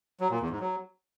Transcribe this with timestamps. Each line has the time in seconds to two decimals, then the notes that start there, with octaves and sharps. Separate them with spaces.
0.21 F#3
0.30 A#2
0.40 E2
0.50 G#2
0.60 F#3